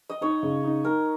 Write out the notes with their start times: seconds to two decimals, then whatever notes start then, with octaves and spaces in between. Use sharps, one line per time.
0.10 D#5
0.21 D#4 C#5
0.43 C#3
0.64 D#4
0.84 D#4 A#4